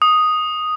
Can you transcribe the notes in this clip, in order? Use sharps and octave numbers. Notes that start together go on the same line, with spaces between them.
D#6